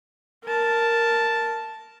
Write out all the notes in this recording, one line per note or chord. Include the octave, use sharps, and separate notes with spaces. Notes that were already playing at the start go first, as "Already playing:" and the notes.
A#4 A5